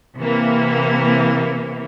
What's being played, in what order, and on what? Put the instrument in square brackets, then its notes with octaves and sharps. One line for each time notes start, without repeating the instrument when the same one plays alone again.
[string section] C3 E3 A#3